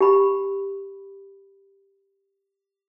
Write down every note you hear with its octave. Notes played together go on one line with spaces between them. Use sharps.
G4 B5